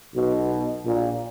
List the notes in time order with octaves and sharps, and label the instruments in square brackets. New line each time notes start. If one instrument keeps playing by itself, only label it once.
[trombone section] B1 B2
A#1 A#2